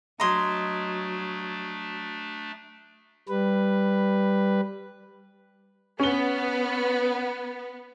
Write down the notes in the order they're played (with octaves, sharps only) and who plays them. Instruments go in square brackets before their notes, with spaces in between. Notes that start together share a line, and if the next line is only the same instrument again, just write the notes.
[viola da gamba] F#3 [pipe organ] A3 D4 [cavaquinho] D#5 C6 [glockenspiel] A#5 D#6 G#6
[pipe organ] G3 B4
[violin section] B3 [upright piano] C#4 G7